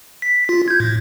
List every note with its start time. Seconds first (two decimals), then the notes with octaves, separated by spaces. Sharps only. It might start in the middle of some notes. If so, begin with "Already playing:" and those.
0.22 B6
0.49 F4
0.68 G6 G#6
0.80 A2